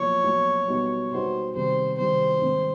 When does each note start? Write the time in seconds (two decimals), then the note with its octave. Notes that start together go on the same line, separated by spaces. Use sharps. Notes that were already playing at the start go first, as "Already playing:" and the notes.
Already playing: B1 A#2 F3 C#5
0.24 B1 A#2 F3
0.67 B2 G3 B3 D#4 F#4
1.11 B2 G3 B3 D#4 F#4 C5
1.55 C3 D#3 G3 C4 C5
1.97 C3 D#3 G3 C4 C5
2.41 G#2 D#3 G3 C4